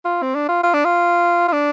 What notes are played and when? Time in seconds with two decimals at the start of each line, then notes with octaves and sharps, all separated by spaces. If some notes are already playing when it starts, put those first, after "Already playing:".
0.05 F4
0.23 C4
0.35 D4
0.49 F4
0.63 F4
0.74 D4
0.85 F4
1.48 F4
1.53 D4